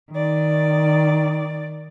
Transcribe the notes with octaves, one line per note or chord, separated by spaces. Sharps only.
D#3 D5